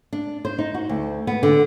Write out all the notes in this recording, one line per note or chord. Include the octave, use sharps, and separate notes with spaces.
D4
C5
D#4
F#4
D2
B3
D3